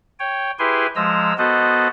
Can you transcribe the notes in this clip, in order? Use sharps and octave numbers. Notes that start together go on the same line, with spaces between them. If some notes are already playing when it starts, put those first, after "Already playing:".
C#5 G5
E4 G4 G#4 B4 G#5 C6
F3 G#3 A#5 E6
B3 F#4 A4 C5 D#5 F#5